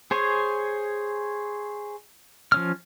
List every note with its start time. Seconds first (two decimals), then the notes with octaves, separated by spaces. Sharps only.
0.11 G#4 C5 C#5 G#5
2.52 F3 C#4 F6